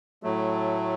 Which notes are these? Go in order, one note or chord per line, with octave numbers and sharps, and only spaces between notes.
A2 F#3 A3